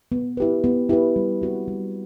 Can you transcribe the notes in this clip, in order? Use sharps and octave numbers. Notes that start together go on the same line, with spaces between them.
B3
E4 G4 B4
B3
E4 G4 B4
G3
C4 F#4 B4
G3